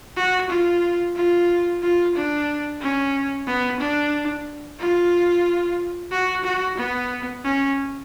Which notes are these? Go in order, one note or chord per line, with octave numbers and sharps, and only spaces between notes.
F#4
F4
F4
F4
D4
C#4
B3
D4
F4
F#4
F#4
B3
C#4